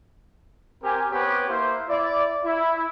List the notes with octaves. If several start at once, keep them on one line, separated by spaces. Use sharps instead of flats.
C4 G4 A#4 G#5
B3 C4 G4 B4 C#5
A#3 E4 C5
E4 D5
E4